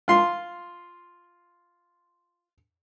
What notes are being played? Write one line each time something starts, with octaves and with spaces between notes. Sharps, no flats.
F4 C6